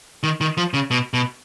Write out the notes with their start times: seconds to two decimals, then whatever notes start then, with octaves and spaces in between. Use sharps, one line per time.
0.23 D#3
0.41 D#3
0.57 F3
0.74 C#3
0.91 B2
1.14 B2